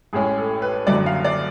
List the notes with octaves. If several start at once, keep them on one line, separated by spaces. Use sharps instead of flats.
A1 A2 G#3 C#4 G#4
A4
B4
F#1 F#2 D3 F#3 D5
F5
D5